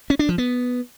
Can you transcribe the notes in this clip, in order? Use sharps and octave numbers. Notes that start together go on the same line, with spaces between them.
C#4
D4
F3
B3